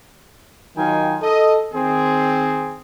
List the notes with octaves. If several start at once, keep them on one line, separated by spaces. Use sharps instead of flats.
D#3 F#3 D#4 F4 G5 G#5
A4 D#5
D#3 C4 G#4